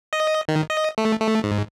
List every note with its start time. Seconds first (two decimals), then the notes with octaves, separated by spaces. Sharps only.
0.13 D#5
0.48 D#3
0.70 D#5
0.98 A3
1.20 A3
1.44 G#2